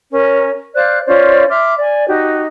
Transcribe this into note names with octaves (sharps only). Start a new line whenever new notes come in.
C#4 A#4
C5 D5 F5 F#6
C#4 F4 C5 D5
E5 C6 D6 F6
D5 G#5
D#4 F#4 G4